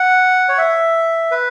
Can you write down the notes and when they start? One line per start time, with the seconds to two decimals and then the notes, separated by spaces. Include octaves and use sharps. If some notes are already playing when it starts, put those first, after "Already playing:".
Already playing: F#5
0.49 C#5
0.58 E5
1.31 B4